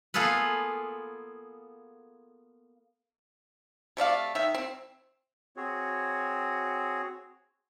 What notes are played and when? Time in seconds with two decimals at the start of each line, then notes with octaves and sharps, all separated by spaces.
0.14 A#3 B3 F4 G#4 A4 B4
3.97 C3 A3 D5 F5
4.35 D#3 E5
4.55 C4
5.57 C4 F#4 G#4 C#5